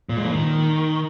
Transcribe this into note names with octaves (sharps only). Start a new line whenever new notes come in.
A#2
G#3
F3
D#3